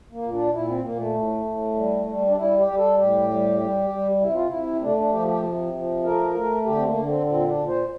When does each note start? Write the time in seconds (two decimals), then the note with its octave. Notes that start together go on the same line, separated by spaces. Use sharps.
0.12 A#3
0.22 A#2
0.32 D4
0.53 A#2 E4
0.68 C4
0.84 A#2 A#3
0.99 A3
1.14 A2
1.45 A2
1.75 G3
2.06 G3
2.28 D4
2.37 G3 E4
2.57 G4
2.68 G3
2.77 A4
2.97 A2 G4
3.29 G3
3.59 G3
3.90 G3
4.20 C3 E4
4.34 F4
4.47 C3 E4
4.82 A3 D4
4.97 D4
5.12 F3 G4
5.27 G4
5.43 C3
5.73 F3
6.04 A3 A#4
6.35 A3
6.65 D3 G4
6.76 C4
6.86 A#3
6.95 D3
7.06 C4
7.26 A#2 C4
7.46 D4
7.57 A#2
7.68 C5